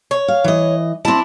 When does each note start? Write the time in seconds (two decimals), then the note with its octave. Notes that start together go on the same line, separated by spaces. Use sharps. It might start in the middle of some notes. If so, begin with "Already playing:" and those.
0.11 C#5
0.28 F5
0.44 E3 D#5
1.05 C4 D4 E4 A5